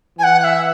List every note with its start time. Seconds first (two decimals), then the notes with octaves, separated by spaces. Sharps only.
0.18 E3 G#5
0.23 F#5
0.40 F#5
0.44 E5